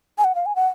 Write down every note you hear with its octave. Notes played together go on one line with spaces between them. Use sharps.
G#5
F#5
F5
G#5
F#5